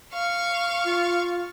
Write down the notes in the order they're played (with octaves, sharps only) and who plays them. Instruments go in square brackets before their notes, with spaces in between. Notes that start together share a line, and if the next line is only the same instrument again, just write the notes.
[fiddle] F5 C#6
[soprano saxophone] F4